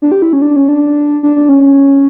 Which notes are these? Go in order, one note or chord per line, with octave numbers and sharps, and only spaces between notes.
D4
G4
E4
C#4
D4
C#4
D4
D4
D4
C#4